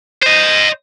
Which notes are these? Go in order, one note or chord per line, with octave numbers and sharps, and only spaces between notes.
C5 D#5